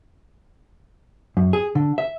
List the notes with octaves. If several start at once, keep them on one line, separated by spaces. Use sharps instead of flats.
F#2
G#4
D3
E5